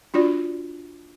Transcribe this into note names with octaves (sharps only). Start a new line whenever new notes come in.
D4 F4 F#4 D5